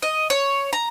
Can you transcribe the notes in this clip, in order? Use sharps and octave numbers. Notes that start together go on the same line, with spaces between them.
D#5
C#5
A#5